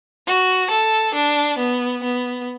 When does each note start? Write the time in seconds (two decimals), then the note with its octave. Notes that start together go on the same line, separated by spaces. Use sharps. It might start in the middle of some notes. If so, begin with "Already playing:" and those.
0.27 F#4
0.71 A4
1.15 D4
1.59 B3
2.04 B3